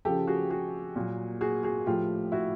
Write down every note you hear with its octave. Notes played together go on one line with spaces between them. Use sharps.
C#3 F3 G4 A4
F#4 G#4
F#4 G#4
A#2 F#3
F#4 G#4
F#4 G#4
A2 F3 F4 G4
E4 F#4